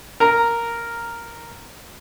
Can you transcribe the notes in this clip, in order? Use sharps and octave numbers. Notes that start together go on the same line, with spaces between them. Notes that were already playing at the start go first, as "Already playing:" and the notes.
A#4 A#5